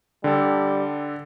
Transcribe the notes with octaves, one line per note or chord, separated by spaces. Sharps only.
D3 G3 A4